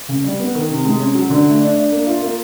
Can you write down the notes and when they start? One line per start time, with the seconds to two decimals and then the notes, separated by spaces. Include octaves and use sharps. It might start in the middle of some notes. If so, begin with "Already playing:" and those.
0.09 C#3
0.24 G3
0.39 B3
0.55 D#3
0.70 C3
0.85 G#3
1.00 C#4
1.15 F#3
1.30 D3
1.46 A3
1.61 D4
1.75 D4
1.92 A#3
2.06 F4
2.22 A#3